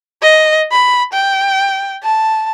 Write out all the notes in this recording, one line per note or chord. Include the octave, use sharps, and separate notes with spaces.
D#5
B5
G5
A5